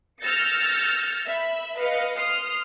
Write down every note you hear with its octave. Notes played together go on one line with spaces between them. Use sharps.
E6 F6 G6 A6 A#6 C#7
E5 B5
B4 D#5 F5 C#7
C6 D#6 F6 C7